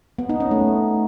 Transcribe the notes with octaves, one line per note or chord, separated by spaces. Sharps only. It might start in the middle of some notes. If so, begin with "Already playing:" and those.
B3
D#4
C#4
A3